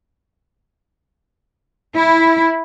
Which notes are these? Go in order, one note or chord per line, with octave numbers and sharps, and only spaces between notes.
E4